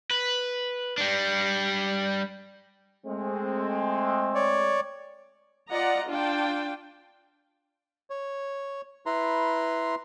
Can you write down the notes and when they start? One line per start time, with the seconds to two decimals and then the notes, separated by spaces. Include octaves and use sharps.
0.11 B4
0.98 G3 D4
3.06 G#3 A3 C4
4.35 C#5 D5
5.70 F4 D5 D#5 F#5 A#5
6.08 D4 F4 G5
8.10 C#5
9.06 E4 B4 A#5 C6